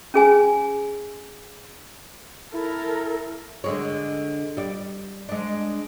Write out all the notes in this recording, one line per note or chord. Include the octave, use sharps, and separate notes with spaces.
C#4 G#4 G#5
E4 A4 A#4
D3 G#3 C#5
G3 D5
G#3 D4